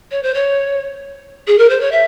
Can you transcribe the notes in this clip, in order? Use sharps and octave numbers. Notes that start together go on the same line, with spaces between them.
C#5
C5
C#5
G#4
A#4
C5
C#5
E5